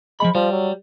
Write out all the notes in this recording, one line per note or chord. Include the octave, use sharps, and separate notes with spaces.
F3 G#3 A3 B5
F3 G3
F#3